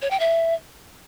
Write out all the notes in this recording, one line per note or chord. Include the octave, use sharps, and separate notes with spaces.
C#5
G5
E5